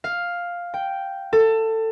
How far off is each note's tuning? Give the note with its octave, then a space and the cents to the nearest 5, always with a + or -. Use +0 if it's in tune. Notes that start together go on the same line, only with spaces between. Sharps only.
F5 +5
G5 -5
A4 +20